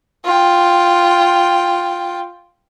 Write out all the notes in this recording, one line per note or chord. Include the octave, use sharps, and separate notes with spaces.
F4 G5